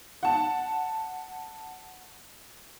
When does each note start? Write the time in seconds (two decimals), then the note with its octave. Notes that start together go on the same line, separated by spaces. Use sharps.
0.23 F#5 A5